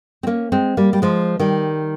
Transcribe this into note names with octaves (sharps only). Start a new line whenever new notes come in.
C4
A#3 C#4
G#3 C4
G3 A#3
G3
F3 G#3
D#3 G3